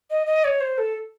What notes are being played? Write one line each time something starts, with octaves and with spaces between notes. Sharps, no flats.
D#5
D#5
C#5
C5
A4